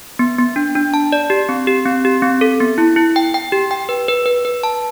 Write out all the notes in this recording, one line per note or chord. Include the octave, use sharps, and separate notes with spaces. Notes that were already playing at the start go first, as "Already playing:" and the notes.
B3
B3
D4
D4
A5
D5
G4
C4
G4
C4
G4
C4
A4
B3
E4
E4
G5
G5
G4
G5
B4
B4
B4
B4
A5